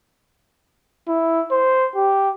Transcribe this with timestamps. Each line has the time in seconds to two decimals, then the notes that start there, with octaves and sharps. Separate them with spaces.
1.08 E4
1.51 C5
1.96 G4